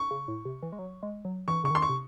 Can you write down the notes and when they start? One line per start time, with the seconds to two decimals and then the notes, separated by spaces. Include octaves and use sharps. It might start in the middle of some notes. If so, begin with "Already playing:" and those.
Already playing: C#6
0.11 C#3
0.28 A2
0.45 C3
0.63 E3
0.72 G#3
0.79 F#3
1.03 G#3
1.25 F#3
1.48 E3 C#6
1.64 C#3 C#6
1.70 D#3
1.75 C6
1.82 C#6
1.89 C3